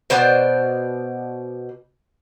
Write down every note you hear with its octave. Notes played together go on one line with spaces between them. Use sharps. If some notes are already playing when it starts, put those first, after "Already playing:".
B2 C5 D5 F#5